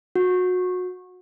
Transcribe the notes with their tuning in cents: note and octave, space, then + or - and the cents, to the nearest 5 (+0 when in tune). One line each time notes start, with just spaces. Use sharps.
F#4 -25